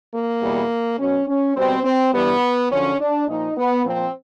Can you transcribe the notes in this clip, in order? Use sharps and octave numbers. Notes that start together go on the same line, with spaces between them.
A#3
E2 B2 G3
B2 F#3 C#4
C#4
B2 G3 C4
C4
G2 E3 G3 B3
F#2 D3 F3 C#4
D4
A#2 F3 D#4
B3
A#2 F3 C4